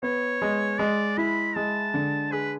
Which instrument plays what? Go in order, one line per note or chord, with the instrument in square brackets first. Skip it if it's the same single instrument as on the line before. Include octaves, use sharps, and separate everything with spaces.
[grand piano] B3 [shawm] C#5
[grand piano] G#3
[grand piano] G#3 [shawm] D5
[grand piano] E4 [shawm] B5
[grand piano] G#3 [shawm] A5
[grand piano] D3
[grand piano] G#4 [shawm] B4